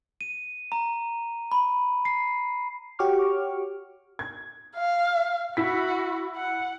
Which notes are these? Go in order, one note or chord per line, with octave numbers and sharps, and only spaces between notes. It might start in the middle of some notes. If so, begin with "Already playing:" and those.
D#7
A#5
B5
C7
F#4 G4 C#5 C#6 D6 F6
G#6
F5
E4 F#4 B6
F#5